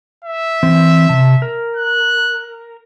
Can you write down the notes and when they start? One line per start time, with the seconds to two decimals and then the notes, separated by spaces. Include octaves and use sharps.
0.24 E5
0.63 E3 C4
1.09 C3 A5
1.42 A#4
1.76 F#6